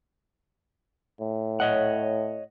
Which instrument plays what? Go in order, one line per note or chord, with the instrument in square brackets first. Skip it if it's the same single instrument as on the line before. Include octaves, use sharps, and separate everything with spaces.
[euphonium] A2
[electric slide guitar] C#5 D#5 F#5